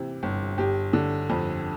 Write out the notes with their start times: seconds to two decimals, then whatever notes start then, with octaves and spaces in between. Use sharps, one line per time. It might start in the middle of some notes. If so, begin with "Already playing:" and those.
Already playing: C3 E3
0.23 G1
0.58 G1 G4
0.93 D3
1.30 F2